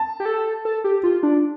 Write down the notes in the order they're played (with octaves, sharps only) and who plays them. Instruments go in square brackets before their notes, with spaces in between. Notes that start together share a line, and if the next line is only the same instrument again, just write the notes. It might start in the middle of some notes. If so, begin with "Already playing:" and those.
Already playing: [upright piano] A5
[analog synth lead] G4
A4
A4
G4
F4
D4